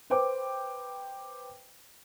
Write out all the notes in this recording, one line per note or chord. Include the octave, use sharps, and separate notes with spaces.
B4 C5 G5 D6